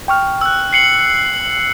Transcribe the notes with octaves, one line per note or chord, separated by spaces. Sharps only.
G5 C#6 F6
E6 F#6
C7 C#7 F#7